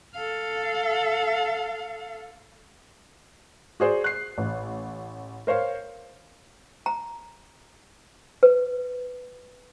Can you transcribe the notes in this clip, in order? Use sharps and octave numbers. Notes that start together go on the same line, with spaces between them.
A4 F5
F#4 G#4 C5 D5
F#6 C7
A1
A#4 C5 C#5 F5
A#5
B4